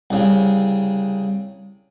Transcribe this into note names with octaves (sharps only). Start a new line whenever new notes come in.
C2 C#3